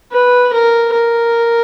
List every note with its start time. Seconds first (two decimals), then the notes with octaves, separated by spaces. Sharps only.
0.12 B4
0.53 A#4
0.93 A#4